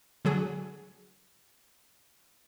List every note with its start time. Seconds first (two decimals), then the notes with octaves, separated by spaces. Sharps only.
0.25 D3 F#3 G#4